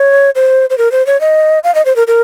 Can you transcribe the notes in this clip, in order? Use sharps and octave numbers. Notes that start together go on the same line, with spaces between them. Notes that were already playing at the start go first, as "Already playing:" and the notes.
Already playing: C#5
C5
C5
A#4
C5
C#5
D#5
F5
D#5
C5
A#4
A#4